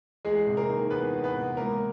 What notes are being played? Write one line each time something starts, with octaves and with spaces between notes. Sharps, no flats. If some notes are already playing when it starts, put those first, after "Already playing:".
E2 G#3 G#4
C3
A#3 A#4
D#3
E2 B3 B4
E2
B3 B4
C3
C#2 A#3 A#4